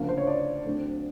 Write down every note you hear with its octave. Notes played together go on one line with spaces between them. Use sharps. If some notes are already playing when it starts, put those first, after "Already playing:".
Already playing: D2 C#3 F3 A#3
C5
C#5
D5
D2 D3 F#3 A3 C4